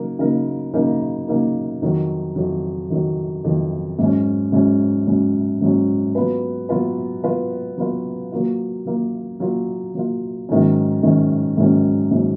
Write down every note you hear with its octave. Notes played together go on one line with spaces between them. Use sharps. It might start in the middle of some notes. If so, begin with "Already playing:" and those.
Already playing: C#3 F#3 A#3 D#4 A#4
C#3 F#3 A#3 D#4 A#4
C#3 F#3 A#3 D#4 A#4
C#3 F#3 A#3 D#4 A#4
F2 D#3 F#3
F2 D#3 F#3
F2 D#3 F#3
F2 D#3 F#3
G#2 F#3 C#4
G#2 F#3 C#4
G#2 F#3 C#4
G#2 F#3 C#4
F#3 B3 F4 B4
F#3 B3 F4 B4
F#3 B3 F4 B4
F#3 B3 F4 B4
F#3 A#3 F4
F#3 A#3 F4
F#3 A#3 F4
F#3 A#3 F4
G#2 D#3 F#3 C#4
G#2 D#3 F#3 C#4
G#2 D#3 F#3 C#4
G#2 D#3 F#3 C#4